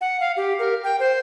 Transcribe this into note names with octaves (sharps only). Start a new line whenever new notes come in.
F#5
F5
G4
A#4
G5
C5